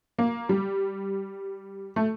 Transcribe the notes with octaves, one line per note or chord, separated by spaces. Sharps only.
A#3
G3
A3